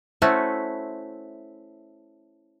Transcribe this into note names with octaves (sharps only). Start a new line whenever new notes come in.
A3 C#4 E4 F#4 C5 E5